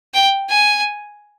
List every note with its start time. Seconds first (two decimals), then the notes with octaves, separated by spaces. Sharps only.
0.14 G5
0.50 G#5